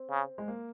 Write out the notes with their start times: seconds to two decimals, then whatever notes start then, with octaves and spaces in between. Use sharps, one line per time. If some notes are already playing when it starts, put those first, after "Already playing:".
Already playing: C4
0.10 C#3
0.38 G#3
0.48 A#3